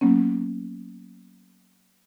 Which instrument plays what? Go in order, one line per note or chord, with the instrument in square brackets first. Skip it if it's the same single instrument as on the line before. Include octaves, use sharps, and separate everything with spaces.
[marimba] F#3 A#3 B3 C#4